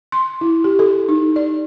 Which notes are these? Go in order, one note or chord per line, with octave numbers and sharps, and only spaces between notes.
C6
E4
G4
A4
D#4
D5